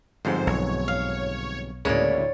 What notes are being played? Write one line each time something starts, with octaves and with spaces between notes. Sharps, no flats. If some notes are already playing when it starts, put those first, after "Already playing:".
G1 F2 G#2 C5
B1 C#5
F5
D2 A2 C#3 G#3 A#3 C#5 D5